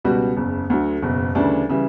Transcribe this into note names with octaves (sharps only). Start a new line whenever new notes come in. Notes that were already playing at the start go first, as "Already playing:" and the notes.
C#2 B2 G3 B3 F#4
F#1 E2 C#3
D2 D3 F#3
F#1 E2 B2
D2 C#3 E3 G3 D4
C#3 E3 G3